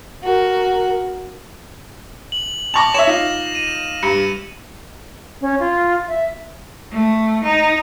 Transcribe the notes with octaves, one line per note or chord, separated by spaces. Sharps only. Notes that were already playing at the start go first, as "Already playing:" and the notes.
F#4 A#4
F#7
A5 C#6 D6 A#6 F7
C#5 E5 E7 F7
D#4 F4
D#7
G2 C#7
C#4
F4
E5
A3
D#4